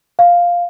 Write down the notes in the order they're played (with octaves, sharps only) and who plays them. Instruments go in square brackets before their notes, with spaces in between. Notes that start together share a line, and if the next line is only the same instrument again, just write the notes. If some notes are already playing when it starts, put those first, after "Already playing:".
[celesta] F5